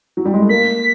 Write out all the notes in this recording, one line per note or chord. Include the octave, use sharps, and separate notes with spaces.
F#3
G3
G#3
A3
A#3 B6